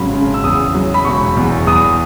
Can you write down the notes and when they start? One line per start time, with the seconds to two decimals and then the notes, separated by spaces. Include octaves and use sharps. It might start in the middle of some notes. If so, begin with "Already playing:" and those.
Already playing: G#1 C#3 F#3 B5
0.13 C#3
0.34 E6
0.44 E2 D#6
0.74 F#3
0.94 B5
1.05 E1 C#6
1.37 E2
1.67 E2 D#6